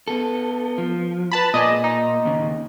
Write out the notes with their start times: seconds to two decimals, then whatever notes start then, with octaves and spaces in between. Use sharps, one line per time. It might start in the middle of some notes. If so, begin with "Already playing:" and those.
0.08 B3 A4
0.78 F3
1.32 B4 A5 B5
1.54 A#2 G#4 D5 D#5
1.84 D#4
2.25 D#2 C#3